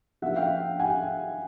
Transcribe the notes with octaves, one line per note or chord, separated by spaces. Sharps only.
C#3 F3 A#3 D4 F4 E5 F#5
F5 G5
F#5 G#5